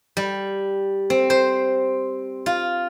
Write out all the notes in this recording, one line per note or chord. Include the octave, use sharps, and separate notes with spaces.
G3
C4
C5
F4